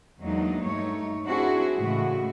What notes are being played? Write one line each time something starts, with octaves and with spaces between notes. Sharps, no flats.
E2 F#3 G#3 A#3 D4 D#4
G2 A3 D#4 C#5
C4 D4 E4 F#4 G#4
A2 C#3 E3 G#3 A3 F#4